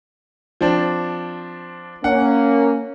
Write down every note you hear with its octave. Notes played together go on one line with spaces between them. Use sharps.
F3 C4 D4
A#3 C#4 F#5